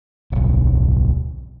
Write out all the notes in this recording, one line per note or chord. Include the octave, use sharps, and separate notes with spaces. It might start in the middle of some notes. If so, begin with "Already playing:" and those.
D1 B1